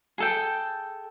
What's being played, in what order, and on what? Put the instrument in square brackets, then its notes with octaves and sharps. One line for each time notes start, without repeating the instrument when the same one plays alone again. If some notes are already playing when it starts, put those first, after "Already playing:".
[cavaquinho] G#4 A4 G5